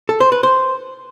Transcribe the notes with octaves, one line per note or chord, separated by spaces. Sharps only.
A4
C5
B4
C5